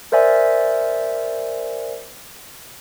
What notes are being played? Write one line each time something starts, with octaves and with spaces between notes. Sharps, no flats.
A#4 C5 D5 E5 G#5